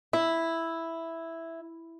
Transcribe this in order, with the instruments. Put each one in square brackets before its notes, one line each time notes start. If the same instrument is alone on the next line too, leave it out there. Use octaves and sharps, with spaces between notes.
[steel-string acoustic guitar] E4 [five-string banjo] E5